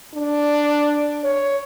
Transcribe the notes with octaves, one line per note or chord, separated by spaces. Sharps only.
D4
C#5